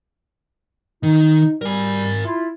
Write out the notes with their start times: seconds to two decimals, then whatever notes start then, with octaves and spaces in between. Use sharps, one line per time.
1.03 D#3 D#4
1.61 G3 A#4 G#5
2.25 E4 F4